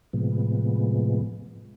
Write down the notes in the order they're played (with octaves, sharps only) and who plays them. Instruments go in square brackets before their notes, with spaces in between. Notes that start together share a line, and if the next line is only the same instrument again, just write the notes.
[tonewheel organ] A2 C3 F3 G#3 B3